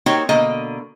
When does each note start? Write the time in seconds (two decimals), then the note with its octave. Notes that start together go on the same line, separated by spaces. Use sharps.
0.06 A#3 C4 D#4 F#4 G4 C#5
0.29 B2 D3 A#3 D#5